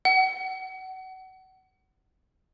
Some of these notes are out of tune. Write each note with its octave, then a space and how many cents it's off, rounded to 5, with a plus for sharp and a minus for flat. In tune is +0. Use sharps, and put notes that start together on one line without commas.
F#5 +30